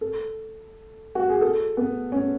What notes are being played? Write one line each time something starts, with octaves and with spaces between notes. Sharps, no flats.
A4
F#4
G#4
A4
B3
C#4